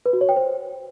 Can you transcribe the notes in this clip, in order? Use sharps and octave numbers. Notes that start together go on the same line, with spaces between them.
B4
F#4
C#5
G5
C5